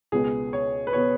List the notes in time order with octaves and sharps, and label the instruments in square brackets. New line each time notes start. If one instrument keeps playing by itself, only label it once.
[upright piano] C#2 B2 B3 [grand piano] G#4
[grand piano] C#5
B4
[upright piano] B2 B3 [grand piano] C#5